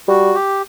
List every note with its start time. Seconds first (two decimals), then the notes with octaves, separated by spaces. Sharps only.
0.08 G3 F#4
0.34 G4